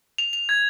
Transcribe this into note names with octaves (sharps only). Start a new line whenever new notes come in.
F7
F7
G#6